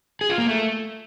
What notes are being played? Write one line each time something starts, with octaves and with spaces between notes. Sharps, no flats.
G#4
F4
A#3
A3